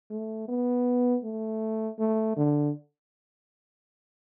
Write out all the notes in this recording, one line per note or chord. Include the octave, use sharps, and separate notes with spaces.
A3
B3
A3
A3
D3